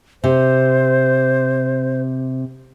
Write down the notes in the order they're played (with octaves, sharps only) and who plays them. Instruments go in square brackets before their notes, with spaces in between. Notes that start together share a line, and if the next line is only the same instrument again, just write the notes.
[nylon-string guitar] C3 [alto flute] C5